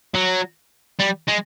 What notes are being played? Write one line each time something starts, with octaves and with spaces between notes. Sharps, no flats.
F#3
G3
G#3